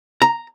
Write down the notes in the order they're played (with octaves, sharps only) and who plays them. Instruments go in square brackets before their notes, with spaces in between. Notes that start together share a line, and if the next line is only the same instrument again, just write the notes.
[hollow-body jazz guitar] A#5